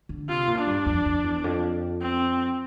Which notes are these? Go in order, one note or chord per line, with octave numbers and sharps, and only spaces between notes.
D3
C3 F4
A#2
D4
G2
F2
F2
E2
F2
C4